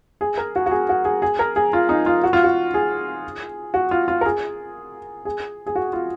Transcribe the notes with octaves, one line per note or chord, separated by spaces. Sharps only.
G#4
A#4
F#4
F#4
G#4
F#4
G#4
G#4
A#4
G#4
F4
D#4
F4
F#4
F4
F#4
G#4
F#4
F4
F4
A#4
G#4
G#4
G#4
F#4
F4